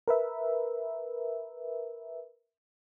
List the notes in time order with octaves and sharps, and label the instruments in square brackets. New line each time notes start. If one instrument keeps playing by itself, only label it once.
[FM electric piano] A#4 B4 E5